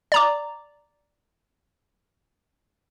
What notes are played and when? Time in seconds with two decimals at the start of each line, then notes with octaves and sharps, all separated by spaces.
0.12 D5 A#5 D6